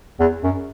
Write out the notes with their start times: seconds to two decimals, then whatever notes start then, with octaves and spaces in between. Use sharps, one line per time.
0.20 E2
0.43 F#2